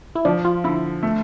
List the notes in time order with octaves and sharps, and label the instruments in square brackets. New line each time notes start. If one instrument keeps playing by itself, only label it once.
[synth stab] E4
[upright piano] F3 [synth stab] D4
[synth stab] F4
[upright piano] D3 [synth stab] E4
[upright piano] A3